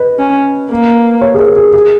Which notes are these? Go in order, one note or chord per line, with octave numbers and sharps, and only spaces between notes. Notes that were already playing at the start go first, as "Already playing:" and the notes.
Already playing: B4 D#5
C#4
A#3
C#5
G#4
A#4
G#4
G#4